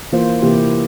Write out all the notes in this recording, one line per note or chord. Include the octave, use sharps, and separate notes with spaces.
E3 A#3 F4 C5
C3 E3 A#3 E4 G4